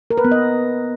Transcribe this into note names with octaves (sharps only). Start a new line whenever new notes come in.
A#4
B4
B3
D#5